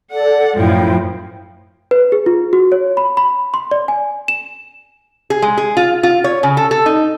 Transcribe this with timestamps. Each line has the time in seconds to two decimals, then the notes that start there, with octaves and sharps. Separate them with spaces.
0.11 A4 D5 F#5
0.56 F#2 A2 F3 E4 G5
1.91 B4
2.12 G#4
2.26 F4
2.53 F#4
2.72 C#5
2.97 B5
3.17 B5
3.54 C6
3.71 D5
3.88 G#5
4.28 E7
5.30 G#4
5.42 G#3
5.57 G#4
5.77 F4
6.03 F4
6.24 C#5
6.43 C#3
6.57 A4
6.71 A4
6.86 D#4